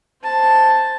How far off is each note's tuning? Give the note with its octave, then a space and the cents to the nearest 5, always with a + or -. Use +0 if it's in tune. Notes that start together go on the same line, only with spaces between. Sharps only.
C5 +0 A5 +0